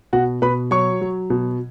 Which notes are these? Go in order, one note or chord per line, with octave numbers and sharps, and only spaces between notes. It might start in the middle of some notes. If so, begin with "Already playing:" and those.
B2 F#4 F#5
B2 B4 B5
F#3 C#5 C#6
F#3
B2